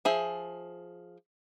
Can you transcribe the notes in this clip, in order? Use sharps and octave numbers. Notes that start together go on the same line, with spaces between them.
F3 G#4 E5